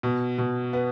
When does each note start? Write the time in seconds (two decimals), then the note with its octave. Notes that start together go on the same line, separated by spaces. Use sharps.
0.03 B2
0.38 B2
0.73 B3